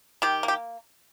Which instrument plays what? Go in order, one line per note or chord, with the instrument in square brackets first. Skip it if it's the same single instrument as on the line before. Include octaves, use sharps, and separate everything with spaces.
[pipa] D#3 G4
A#3
G4